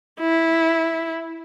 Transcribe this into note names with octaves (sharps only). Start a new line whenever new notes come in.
E4